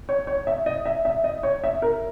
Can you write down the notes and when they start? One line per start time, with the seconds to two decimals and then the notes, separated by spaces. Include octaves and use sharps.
0.09 C#5
0.27 C#5
0.47 E5
0.66 D#5
0.85 E5
1.05 E5
1.24 D#5
1.43 C#5
1.64 E5
1.82 A#4